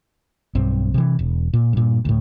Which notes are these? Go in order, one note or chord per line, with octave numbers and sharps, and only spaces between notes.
B1 G2 C4
C3 E3
E1
A#2
G2 A#2
D2 A2